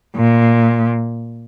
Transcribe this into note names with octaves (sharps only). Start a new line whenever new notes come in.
A#2